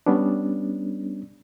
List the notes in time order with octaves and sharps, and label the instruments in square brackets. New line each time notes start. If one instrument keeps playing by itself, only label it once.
[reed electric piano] G3 B3 C#4 D4